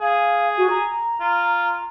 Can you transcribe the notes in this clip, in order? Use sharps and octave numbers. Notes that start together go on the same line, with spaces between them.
G#4 F5
F#4
A#5
F4